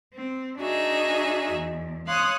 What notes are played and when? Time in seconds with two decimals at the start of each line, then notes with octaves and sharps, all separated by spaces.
0.13 C4
0.59 D4 D#4 F#4 G#4 E5
1.51 E2
2.07 C#5 F5 C6 D#6 F#6